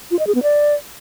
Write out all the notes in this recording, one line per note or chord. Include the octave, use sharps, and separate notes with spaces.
F4
D#5
G#4
B3
D5